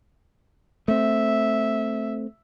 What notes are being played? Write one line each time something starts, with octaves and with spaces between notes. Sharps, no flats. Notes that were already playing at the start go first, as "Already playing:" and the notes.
A3 C4 E5